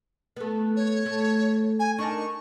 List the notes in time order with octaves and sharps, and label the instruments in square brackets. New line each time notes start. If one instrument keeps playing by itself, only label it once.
[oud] A3 B3
[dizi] C#5
[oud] A3
[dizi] G#5
[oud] D4 D#4 A#4 [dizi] C#6